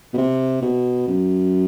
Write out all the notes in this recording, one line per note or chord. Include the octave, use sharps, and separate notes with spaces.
B2
C3
B2
F#2